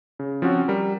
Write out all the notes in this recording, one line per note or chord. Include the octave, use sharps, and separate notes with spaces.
C#3
F3 C4 C#4 F#4
G3 A#4